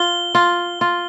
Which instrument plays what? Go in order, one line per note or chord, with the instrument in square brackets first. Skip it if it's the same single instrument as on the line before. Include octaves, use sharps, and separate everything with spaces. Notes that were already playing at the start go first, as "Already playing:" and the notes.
Already playing: [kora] F4 [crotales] G7
[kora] F4
F4